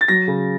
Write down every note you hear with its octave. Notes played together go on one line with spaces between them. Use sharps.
A6
F#3 A#6
C#3